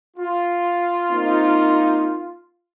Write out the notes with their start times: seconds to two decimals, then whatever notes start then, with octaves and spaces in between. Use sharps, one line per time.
0.17 F4
1.11 A#3 C4 D#4